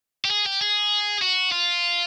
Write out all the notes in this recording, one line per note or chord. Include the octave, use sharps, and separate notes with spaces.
G4
G#4
G4
G#4
F#4
F4